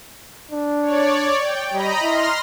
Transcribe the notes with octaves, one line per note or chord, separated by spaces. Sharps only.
D4
C#5 D5
G5
G3 D#5 A#5 B5
E4 C6 F6 A#6